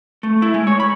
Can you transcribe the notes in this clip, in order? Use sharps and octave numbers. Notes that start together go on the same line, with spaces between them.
A3
E4
G#3
C#5
B5